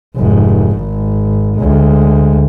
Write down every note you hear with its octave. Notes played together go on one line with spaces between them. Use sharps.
F1 G#2
G#1
D2 G#3